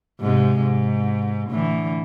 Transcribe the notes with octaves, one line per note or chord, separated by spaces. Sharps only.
G#2 C3 G#3
G#2
A2 D3 E3